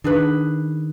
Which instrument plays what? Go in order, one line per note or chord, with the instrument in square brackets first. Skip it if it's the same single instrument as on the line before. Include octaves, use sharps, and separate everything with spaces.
[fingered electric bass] D#3 [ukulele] D4 G#4 B4